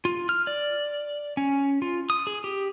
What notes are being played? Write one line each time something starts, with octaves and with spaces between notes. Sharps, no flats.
F4
F6
D5
C#4
F4
D#6
G#4
G4